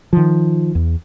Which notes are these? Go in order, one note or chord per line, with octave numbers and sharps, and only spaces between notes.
D#3 F3
E2